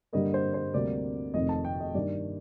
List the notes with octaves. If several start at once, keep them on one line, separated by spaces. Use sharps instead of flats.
G2 D3 G3 A#3 D#5
C5
C5
D2 C3 G3 A#3 D5
F1 F2 D#3 A3 D#5
A5
G5
D#5
G2 D#3 A#3 D5